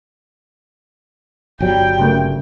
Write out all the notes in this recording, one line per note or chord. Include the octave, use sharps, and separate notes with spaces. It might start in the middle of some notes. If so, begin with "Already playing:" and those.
G1 F#3 G3 G5
C#3 A3 A#3